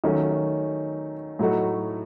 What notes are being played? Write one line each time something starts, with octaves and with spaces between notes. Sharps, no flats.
D#3 F#3 A3 C#4
A2 F#3 A3 D#4 F#4